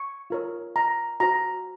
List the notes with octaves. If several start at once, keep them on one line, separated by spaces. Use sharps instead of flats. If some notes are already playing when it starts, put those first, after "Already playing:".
Already playing: C#6
F4 A#4 C#5
A#5
F#4 C5 A#5